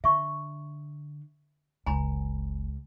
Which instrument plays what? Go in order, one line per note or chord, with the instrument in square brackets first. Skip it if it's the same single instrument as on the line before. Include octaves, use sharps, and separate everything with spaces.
[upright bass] D3 [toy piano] E5 C#6
[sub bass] F#1 [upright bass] C#2 [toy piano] G#5 A#5 B5